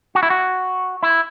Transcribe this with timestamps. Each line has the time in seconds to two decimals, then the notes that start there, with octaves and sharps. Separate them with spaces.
0.15 F#4
0.23 E4
0.30 F#4
1.03 E4